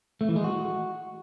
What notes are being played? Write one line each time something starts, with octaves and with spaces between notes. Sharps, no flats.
A3
E3
G#3
F#4